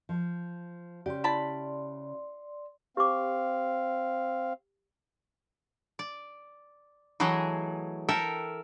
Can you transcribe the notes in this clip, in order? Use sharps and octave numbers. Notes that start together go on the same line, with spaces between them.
F3
C#3 G4 D5 C6
E4 A5 B5
C4 G4 F5 D6
D5
E3 F#3 A3 G#4 D#5
A4 A#4 E5 G5